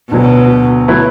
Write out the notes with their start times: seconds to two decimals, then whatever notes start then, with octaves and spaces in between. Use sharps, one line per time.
0.12 D2 B2 D3 F#3
0.88 F#3 A3 E4 B4